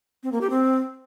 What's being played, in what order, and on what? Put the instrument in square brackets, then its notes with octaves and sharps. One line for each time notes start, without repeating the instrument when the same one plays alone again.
[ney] C4
A#3
G4
C4